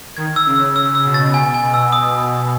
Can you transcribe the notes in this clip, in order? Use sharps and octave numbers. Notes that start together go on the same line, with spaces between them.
D#3 G#6
E6
C#3
E6
E6
E6
B2
A6
B2 G#5
G#5
B2
E6
D#6